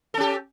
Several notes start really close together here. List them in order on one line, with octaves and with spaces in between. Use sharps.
A4 C#4 G4